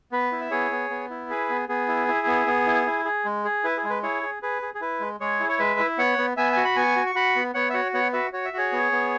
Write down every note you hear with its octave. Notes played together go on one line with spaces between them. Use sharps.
B3 B4
E4
E5
B3 G#4 C#5
B3
B3
E4
G#4 B4
B3
B3 G#4
E4
E4
B3
B3
E4
E4
G#4
G#3
G#4
E4 B4
G#4
G#3
B4
E4 G#4 C#5
G#4
G#4 B4
G#4
G#4
E4 B4
G#3
G#3 G#4 C#5
E4
C#5
G#3 B4 E5
E4
B3 C#5 F#5
B3
B3 E5 G#5
F#4 G#5
B5
B3 G#5 C#6
F#4
C#6
F#4 F#5 B5
B3
B3 C#5 F#5
E5
F#4 C#5 F#5
B3 C#5 F#5
F#4 B4 E5
F#4 C#5
E5
F#4 G#4 C#5
B3
B3